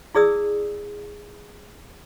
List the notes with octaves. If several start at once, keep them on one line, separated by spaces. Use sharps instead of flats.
E4 G#4 D5 D#6 E6